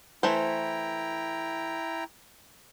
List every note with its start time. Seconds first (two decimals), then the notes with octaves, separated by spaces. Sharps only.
0.23 E3 A3 E4 C5 G5 A#5